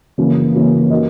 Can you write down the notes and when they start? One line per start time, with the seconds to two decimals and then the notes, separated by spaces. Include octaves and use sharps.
0.18 F#2 C#3 E3 A#3 C#4
0.54 F#2 C#3 E3 A#3 C#4
0.90 D#4 F#4 A#4 D#5